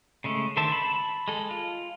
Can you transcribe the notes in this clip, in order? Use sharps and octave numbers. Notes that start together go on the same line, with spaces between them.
C#3 G#3 A3
D3 D#3 C5 E5 A5
A5 B5
G#3 A4
F4